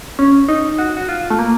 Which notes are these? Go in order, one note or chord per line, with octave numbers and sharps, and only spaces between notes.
C#4
D#4
F#4
F#4
F4
A3
A#3